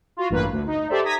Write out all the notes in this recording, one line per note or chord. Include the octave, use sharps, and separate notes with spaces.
F4 F#4
A1 G2 A#3 B4
D2
D#4
G4 A4 C5 D5 E5
A#5 D#6 G#6 A#6 B6